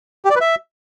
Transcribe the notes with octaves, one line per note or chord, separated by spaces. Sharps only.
G4
D5
B4
E5